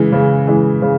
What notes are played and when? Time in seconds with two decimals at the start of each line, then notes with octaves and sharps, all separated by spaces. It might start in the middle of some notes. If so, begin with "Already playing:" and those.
Already playing: C#3 E3 G#3
0.12 C#3
0.47 E3 G#3
0.82 C#3